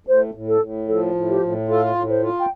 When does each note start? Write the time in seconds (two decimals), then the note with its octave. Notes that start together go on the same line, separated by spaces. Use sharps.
0.07 A2 C5
0.34 A2
0.48 A4
0.61 A2
0.87 F3 A4
1.15 A2
1.28 G4
1.42 A2
1.69 F4 A4
1.95 A2
2.09 C5
2.23 F4
2.39 G5